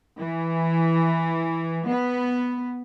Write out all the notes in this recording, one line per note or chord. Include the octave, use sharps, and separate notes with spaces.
E3
B3